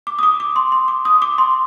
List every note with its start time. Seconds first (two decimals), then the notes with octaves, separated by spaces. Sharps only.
0.07 D6
0.19 D#6
0.23 D6
0.40 D6
0.56 C6
0.72 C6
0.88 D6
1.05 D#6
1.22 D6
1.38 C6